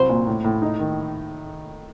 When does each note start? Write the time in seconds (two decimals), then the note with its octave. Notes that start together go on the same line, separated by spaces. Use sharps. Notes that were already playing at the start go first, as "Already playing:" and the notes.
Already playing: C2 F#3 C5
0.09 A#2
0.27 A2
0.44 A2
0.62 D#4
0.79 D#3